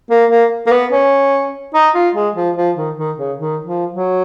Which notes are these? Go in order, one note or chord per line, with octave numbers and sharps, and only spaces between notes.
A#3
A#3
A#3
B3
C#4
D#4
F4
G#3
F3
F3
D#3
D#3
C#3
D#3
F3
F#3